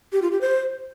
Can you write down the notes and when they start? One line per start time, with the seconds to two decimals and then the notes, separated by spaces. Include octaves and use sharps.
0.12 G4
0.22 F4
0.32 G4
0.41 C5